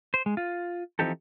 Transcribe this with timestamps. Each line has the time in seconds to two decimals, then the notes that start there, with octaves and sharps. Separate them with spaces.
0.14 C5
0.26 G#3
0.37 F4
0.99 E3 F3 C4 D#4 G4 A4